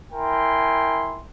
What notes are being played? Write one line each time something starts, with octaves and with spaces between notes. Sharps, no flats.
E4 A#4 G5 G#5 C6